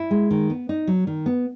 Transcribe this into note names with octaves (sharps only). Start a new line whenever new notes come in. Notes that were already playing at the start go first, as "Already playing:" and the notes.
Already playing: E4
G#3
D#3
B3
D#4
F#3
D#3
B3